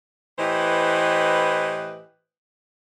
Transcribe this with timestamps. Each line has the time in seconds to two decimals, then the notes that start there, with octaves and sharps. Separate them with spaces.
0.39 A2 E3 G4 B4 C5 D#5